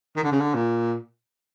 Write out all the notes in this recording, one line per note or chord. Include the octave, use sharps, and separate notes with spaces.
D#3
D3
C#3
D3
A#2